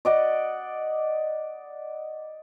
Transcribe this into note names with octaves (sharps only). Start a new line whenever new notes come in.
D5 D#5 F#5